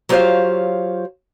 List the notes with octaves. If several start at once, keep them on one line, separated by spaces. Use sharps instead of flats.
F#3 F4 G4 C5 C#5 F5